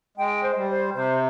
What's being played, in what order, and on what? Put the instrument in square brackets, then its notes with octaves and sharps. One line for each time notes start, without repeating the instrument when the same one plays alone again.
[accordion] G#3 [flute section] G5
[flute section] C5
[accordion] G3
[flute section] C5
[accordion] C3 [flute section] C5